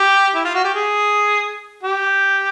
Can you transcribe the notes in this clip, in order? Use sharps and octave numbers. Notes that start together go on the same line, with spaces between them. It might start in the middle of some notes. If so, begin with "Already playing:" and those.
Already playing: G4
E4
F4
F#4
G4
G#4
G4